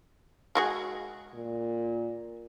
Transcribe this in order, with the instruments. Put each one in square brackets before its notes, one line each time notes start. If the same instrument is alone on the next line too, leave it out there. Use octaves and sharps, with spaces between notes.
[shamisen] G#3 F#4 G#4
[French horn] A#2